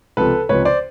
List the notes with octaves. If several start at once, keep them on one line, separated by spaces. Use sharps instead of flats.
C#2 C3 F3 A4 B4
C#2 C3 F3 B4 C#5
C5 D5